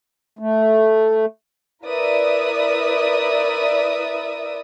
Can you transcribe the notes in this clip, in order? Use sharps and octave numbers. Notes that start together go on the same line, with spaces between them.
A3
E4 A#4 B4 D5 E5 D#6